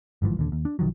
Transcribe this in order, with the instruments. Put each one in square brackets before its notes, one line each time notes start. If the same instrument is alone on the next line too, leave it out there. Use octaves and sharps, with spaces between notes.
[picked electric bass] G1 G#2 E3 F3
D#1 D#2 D3
D#2
D4
B1 D#3 F3 F#3